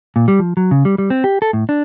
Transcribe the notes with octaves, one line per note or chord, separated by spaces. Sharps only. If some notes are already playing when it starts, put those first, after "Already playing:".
A#2
G3
F3
F#3
C#3
G3
G3
C4
G4
A4
A2
D4